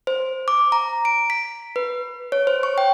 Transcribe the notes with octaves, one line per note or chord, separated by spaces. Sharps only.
C5
D6
A#5
D7
B6
B4
C#5
C5
C#6
G5